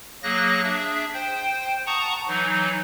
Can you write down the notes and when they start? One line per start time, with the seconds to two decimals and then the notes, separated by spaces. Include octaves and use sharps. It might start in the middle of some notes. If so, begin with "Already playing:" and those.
0.23 F#3 A#3 G#4 F#6 A#6
0.63 D4 G#4 E5
1.14 C5 G5
1.86 F#5 A5 A#5 C#6 D#6
2.27 E3 F#3 D#4